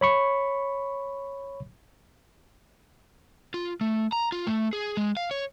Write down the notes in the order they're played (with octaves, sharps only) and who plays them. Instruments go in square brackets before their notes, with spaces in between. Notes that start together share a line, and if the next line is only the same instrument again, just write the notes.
[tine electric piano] C#5 B5 C#6
[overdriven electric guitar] F4
A3
A#5
F4
A3
G#4
G#3
F5
C#5